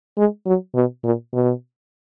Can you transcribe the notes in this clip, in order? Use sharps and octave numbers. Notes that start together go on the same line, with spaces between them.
G#3
F#3
B2
A#2
B2